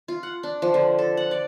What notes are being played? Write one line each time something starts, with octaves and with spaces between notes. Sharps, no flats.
F4
F#5
D4
F3
D3
A4
F#5
D5